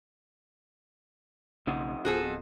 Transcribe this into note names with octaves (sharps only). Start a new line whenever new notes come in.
B1 F2 C#3 A#3 D#4 F#5
D1 F3 B3 F#4 G#4 A4
F2